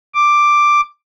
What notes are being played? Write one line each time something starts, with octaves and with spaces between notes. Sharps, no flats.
D6